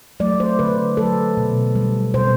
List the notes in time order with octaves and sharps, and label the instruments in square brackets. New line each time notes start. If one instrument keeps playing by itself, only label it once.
[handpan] F#3 A3 D5
C5
D3 B4
F#3 A3 A4
B2
G3
B2 C5